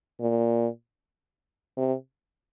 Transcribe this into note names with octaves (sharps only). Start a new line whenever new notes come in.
A#2
C3